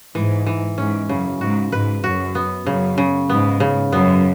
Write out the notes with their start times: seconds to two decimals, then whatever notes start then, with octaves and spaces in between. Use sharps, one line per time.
0.15 G#2 E3
0.46 E3
0.78 G#2 C#4
1.09 F#2 C#3
1.40 G#2 F#4
1.72 G#2 B4
2.04 F#2 F#4
2.35 B3
2.66 F#2 C#3
2.98 C#3
3.29 G#2 B3
3.60 C#3
3.92 F#2 B3